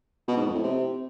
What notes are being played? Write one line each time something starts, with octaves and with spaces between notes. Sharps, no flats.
B2
G#2
F2
A2
C3